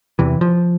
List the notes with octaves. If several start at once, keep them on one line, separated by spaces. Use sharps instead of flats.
E2 C3 E3
F3